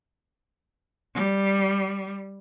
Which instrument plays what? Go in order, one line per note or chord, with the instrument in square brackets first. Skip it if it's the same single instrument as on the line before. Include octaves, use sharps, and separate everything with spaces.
[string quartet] G3